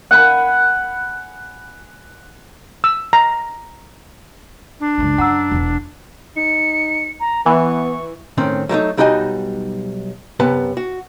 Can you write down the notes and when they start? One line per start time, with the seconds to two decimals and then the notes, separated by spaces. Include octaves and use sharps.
0.11 F#5 G#5 B5
2.84 E6
3.13 A#5
4.80 D4
4.98 C#2 F#2
5.18 F#2 F#5 A#5 E6
5.51 E1 E2
6.37 D#4 C#7
7.20 A#5
7.46 E3 B3 C#6
8.37 A2 D#3 C4 C#4
8.69 F#3 G3 A3 D#4
8.97 B1 G3 D#4 F#4 D#5 G#5
10.40 F#2 C3 B3 B4 A5
10.77 F#4